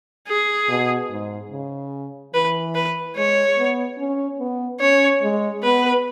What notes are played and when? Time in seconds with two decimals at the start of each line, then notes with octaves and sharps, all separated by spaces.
0.27 G#4
0.69 B2
1.10 G#2
1.51 C#3
2.34 E3 B4
2.75 B4
3.16 G#3 C#5
3.58 B3
3.98 C#4
4.39 B3
4.80 C#4 C#5
5.22 G#3
5.63 B3 B4